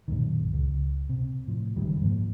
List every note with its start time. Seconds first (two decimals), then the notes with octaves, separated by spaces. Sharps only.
0.08 B1 F#2 A#2 D#3
0.53 C#2
1.09 C3
1.47 A2 F3
1.76 F#1 C2 D#3 G3
2.01 G#2 F3 A#3